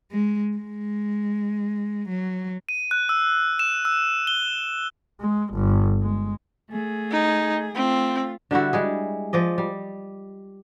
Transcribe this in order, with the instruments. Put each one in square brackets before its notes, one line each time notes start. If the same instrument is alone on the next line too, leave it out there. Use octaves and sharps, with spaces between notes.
[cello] G#3
G#3
F#3
[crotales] D#7
F#6
E6
E7
E6
G7
[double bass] G#3
G1
G#3
[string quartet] A3 G#4
[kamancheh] D#4
[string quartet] A3 F4 [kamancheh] C4
[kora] D3 G3 E4 F#4
G3 G#3 G#4
F3 D5 D#5
G3